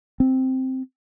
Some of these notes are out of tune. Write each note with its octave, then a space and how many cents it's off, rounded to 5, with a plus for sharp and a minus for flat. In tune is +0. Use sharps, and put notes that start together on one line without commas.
C4 +0